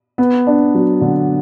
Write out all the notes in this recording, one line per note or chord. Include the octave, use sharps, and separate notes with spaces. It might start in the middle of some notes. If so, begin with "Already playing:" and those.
B3
D4
F#3
D3